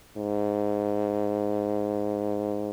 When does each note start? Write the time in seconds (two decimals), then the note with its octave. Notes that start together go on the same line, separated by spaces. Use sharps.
0.17 G#2